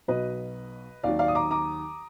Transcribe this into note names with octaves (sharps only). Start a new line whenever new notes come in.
B1 B2 F#3 B4 D#5
D#2 D#3 F#3 D5 F5
D5 F5
D#6
A#5 D6
A#5 D6